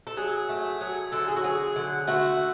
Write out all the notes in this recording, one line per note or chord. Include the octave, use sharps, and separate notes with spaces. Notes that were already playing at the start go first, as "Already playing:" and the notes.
A4
F#3 G#4
A3
F#3 G#4
D3 A4
G#4
F#4
F#3 G#4
D3
A3 F#4